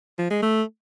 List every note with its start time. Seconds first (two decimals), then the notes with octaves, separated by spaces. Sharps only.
0.19 F3
0.31 G#3
0.43 A3